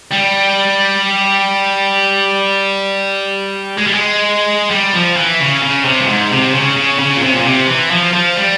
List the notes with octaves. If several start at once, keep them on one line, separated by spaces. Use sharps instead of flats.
G3
G#3
G3
G#3
G3
F3
E3
C#3
C#3
C3
G2
G#2
C3
C#3
C#3
C#3
A#2
C3
A#2
C3
E3
F3
F3
G3